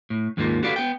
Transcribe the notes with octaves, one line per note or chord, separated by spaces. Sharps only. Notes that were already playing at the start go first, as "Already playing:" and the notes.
A2
D#2 G#2 G#3 A#3 D#4 F4
F#4 G4 A4 B4 D5 F5
B3 G5